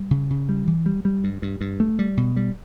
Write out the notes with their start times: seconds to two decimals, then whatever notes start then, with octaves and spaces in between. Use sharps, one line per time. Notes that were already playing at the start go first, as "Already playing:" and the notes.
Already playing: G3
0.11 C#3
0.30 C#3
0.49 G3
0.67 E3
0.86 G3
1.05 G3
1.24 G2
1.42 G2
1.61 G2
1.80 A3
1.99 G3
2.17 B2
2.36 G3